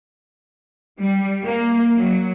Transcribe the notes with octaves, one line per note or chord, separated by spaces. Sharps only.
G3
A#3
F#3